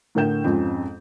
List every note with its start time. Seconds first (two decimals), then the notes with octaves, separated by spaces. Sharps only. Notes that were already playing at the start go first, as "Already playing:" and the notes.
0.15 A2 D3 A#4 G5 G6 E7
0.44 F2 G#2 C4 C#4